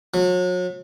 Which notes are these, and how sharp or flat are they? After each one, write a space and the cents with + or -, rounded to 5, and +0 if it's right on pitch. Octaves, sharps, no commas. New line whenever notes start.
F#3 -35